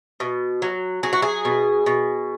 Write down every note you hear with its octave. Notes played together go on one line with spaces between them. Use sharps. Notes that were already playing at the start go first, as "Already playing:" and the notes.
B2
F#3
F#3 G#4
F#4
G#4
B2
B2